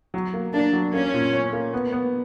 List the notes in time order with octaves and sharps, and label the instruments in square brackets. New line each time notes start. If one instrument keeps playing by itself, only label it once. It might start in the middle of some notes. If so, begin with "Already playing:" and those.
[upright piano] F#3
A#3
[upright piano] A#3 [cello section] D4
[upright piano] F#3
[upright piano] A#3 [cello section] C#4
[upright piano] A#2
C#4
A#3
B3
B3